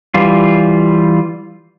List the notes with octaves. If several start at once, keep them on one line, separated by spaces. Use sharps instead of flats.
E3 G3 F4